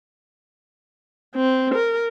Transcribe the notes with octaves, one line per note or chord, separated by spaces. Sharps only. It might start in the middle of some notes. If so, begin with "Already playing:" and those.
C4
A#4